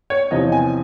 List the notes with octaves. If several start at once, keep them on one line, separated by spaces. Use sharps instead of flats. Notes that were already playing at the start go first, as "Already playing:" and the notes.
C#5
E2 C3 F3 D#5
G#5